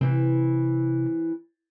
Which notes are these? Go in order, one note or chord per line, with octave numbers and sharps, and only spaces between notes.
C3 E3 C4